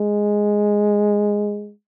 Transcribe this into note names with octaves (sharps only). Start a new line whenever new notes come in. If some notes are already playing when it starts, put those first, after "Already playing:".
Already playing: G#3